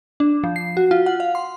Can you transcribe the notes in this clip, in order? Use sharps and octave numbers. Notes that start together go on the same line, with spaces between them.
D4
F3
C7
F#4
F4
F#5
F5
C6